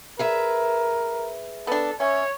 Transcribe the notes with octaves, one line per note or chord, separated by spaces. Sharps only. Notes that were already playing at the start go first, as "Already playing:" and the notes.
G#4 A#4 B4 E5
B3 D4 A4
C#4 C#5 E5